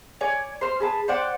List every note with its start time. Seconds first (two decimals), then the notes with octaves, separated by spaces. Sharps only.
0.21 C#5 D5 G#5
0.61 C5 F6
0.80 G#4 B4 A5
1.08 C5 D5 F#5 G5